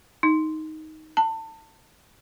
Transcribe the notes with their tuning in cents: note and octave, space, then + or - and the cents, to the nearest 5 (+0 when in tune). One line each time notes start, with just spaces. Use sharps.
D#4 +10
A5 +30